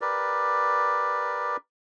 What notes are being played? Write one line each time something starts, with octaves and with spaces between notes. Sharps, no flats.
G4 A#4 B4 D5